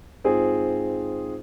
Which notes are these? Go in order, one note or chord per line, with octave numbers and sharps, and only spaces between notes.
G#2 C4 F4 G#4